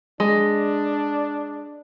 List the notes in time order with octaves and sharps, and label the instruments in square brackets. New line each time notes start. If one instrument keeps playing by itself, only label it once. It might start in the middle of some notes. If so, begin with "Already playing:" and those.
[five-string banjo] G#3 [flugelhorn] D4